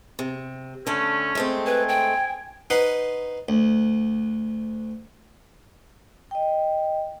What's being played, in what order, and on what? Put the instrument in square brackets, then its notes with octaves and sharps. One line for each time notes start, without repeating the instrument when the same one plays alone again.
[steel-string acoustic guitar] C3
[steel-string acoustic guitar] D3 A3 [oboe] C#4
[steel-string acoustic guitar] G#3 A3 C4
[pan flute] B4 [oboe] G#5
[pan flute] G5
[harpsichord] D#4 B4 C5 F#5 C6
D2
[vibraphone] D#5 G5